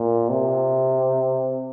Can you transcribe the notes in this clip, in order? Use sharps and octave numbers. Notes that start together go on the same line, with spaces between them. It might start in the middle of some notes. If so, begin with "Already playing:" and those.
Already playing: A#2
C3